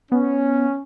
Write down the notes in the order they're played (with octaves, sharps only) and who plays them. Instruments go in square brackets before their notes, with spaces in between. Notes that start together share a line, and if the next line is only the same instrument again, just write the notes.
[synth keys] B3 [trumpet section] C#4